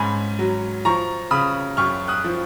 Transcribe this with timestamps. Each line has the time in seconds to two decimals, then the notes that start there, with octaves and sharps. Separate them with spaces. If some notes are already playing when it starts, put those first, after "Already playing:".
Already playing: G#2 C#4 G#5 B5
0.39 F#3
0.85 F3 A#5 C#6
1.31 C#3 B5 D#6
1.77 F#2 C#6 F6
2.08 D#6 F#6
2.25 F3